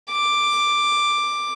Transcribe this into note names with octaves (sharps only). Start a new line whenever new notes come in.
D6